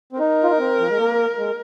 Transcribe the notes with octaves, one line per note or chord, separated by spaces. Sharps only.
C4
D#4 A#4
F4
D#4
C4
F3
G#3
A#3
G#3